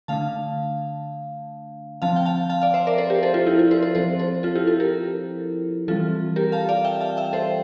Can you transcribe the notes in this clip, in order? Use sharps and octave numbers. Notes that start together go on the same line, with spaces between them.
D3 A3 D4 F5 A5
F3 C4 F5 A5
G5
F5 A5
F5 A5
D5 F5
C5 E5
A#4 D5
A4 C5
G4 A#4
A4 C5
F4 A4
E4 G4
F4
A4 C5
A4 C5
F3 C4 A4 C5
A4 C5
F4 A4
E4 G4
F4 A4
G4 A#4
E3 G3 C4 F4 A4
G4 A#4
F5 A5
D5 F5
E5 G5
F5 A5
E5 G5
A4 C5